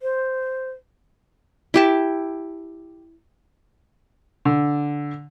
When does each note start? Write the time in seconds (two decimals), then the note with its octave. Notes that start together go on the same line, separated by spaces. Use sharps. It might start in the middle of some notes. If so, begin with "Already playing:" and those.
0.02 C5
1.74 E4 G4 A5
4.45 D3